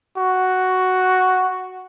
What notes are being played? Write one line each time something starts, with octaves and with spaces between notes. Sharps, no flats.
F#4